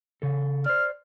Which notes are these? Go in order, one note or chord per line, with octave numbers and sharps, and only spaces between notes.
C#3 A4
C5 D5 F6